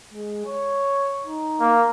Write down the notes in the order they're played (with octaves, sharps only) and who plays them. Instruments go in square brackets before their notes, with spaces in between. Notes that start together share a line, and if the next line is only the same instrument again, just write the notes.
[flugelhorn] G#3
C#5
D#4
[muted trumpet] A#3